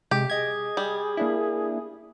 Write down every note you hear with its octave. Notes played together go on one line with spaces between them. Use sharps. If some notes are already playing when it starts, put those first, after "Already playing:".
C3 G#3 G4
G#4 D#5 G#6
G3
A#3 D4 E4